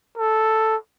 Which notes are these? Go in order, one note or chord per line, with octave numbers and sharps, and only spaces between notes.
A4